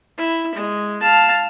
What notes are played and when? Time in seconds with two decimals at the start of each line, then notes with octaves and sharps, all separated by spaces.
0.18 E4
0.55 G#3
1.01 F5 A5